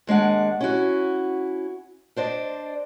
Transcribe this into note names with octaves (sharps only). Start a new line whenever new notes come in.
D#2 G#3 D4 F#5
C#4 E4 F#4
D4 C5 D5 D#5